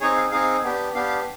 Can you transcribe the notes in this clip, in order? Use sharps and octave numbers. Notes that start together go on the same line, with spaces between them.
C4 D#4 G#4 C#5
F5
C4 D#4 G#4 F5
B3 D4 G4
B3 D4 G4 F5